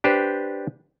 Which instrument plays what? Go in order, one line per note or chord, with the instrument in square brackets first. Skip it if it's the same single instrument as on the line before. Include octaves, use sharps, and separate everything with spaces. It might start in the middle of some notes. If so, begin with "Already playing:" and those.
[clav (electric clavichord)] D4 G4 B4 C5